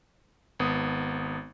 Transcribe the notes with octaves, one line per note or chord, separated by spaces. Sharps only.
G#1 B3 D#6